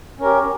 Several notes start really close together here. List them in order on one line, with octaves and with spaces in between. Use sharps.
C#4 A#4 G4